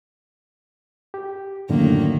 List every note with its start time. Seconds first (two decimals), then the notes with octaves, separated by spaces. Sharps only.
1.14 G4
1.69 F#2 A2 D3 D#3 A#3